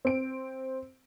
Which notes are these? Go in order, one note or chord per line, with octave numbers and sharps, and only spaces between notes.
C4 D7